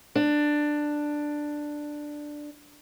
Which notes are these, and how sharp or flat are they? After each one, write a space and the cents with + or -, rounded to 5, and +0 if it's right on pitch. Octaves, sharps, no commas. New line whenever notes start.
D4 +10